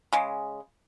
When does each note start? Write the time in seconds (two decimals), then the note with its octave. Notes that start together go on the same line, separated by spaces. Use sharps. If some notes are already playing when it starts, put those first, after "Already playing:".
0.13 C#3 G#3